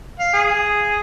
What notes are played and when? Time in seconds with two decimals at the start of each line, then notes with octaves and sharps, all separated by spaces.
0.19 F5
0.33 G#4